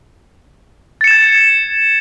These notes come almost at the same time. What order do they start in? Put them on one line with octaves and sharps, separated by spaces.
A6 C#7 E7 G#6